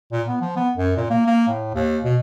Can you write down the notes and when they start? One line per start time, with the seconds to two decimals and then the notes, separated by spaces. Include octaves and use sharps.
0.12 A#2
0.28 B3
0.41 F3
0.56 B3
0.77 F#2
0.97 A#2
1.10 A#3
1.27 A#3
1.48 A2
1.74 D#2
2.04 B2